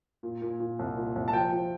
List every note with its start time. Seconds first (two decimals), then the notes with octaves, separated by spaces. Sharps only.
0.23 A#2
0.42 A#2
0.60 A#2
0.79 C2
0.97 A#2
1.15 C2
1.28 A5
1.33 F3 G5
1.52 F3